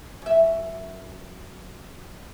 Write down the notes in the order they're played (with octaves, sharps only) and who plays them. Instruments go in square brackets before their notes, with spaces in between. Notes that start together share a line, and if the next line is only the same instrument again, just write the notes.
[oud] F#2 E5